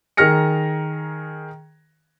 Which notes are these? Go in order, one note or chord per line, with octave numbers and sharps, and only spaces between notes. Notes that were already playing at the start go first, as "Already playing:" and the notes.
D#3 G#4 A#4 F6 A#6 C#7